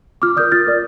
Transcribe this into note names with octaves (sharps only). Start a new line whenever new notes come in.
F4 D6 F6
A#4 D5 D#6 G6
F4 F6 A6
A#4 D5